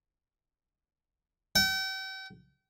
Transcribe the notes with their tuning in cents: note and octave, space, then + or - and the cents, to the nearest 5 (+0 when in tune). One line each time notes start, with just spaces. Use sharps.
G5 -40